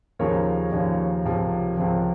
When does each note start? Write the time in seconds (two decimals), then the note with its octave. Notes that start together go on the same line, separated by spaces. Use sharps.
0.19 D#2 C#3 F3 A#4 C#5
0.72 D#2 C#3 F3
1.25 C#2 C3 F3
1.77 C#2 C3 F3